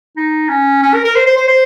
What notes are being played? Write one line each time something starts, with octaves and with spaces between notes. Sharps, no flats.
D#4
C#4
C#4
A#4
A#4
C5
C5
C5
C5